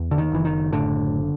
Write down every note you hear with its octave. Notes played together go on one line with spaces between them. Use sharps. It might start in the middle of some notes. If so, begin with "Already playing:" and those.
Already playing: E2
D3
D#3
F#1 E3
D#3
A2 D3